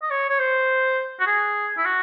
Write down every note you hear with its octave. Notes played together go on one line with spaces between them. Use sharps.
D#5
C#5
C#5
C5
F#4
G#4
E4
F#4